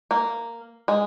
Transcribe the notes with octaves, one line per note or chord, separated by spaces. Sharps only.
A#3
G#3